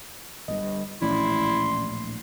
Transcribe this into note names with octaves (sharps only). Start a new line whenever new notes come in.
G1 G2 D#5
D1 A#1 E3 A3 C#4 E4 D5 C6